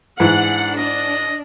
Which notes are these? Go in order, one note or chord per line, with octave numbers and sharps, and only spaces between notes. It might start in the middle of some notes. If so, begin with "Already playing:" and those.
G#2 E3 D4 F#5
D4 D#5